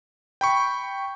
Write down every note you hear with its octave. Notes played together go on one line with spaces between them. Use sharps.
G5 B5 C#6